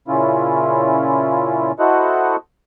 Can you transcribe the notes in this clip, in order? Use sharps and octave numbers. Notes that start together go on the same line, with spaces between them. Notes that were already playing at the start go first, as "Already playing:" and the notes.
A#2 C#3 C#4 E4 F4
E4 F#4 A4 C5 D#5 F#5